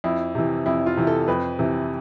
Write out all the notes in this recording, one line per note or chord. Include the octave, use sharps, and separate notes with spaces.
F2 E4
C3 E3
F2 E4
F4
C3 E3
A4
F2 B4
C3 E3